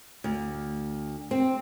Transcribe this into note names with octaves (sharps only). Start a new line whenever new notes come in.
D2
C4